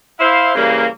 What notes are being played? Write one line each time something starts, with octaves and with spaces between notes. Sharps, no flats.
E4 C5 F5
C#3 E3 G3 A#3